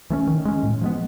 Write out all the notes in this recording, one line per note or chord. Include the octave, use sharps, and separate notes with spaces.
E3 A3 C#4
D#3
G#3 C#4
A2
F3 G#3 B3